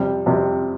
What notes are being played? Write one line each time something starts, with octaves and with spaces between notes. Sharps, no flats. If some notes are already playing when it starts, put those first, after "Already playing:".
Already playing: F2 C3 G3
F2 C3 G3